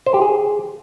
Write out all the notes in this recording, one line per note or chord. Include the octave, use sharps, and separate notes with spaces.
C5
G4
G#4